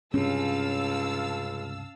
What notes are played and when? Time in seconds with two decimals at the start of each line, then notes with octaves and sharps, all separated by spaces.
0.14 C#2 G2 C3 C#4 F5 A5 E6